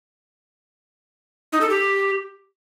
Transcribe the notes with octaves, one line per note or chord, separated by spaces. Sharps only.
D#4
A4
G4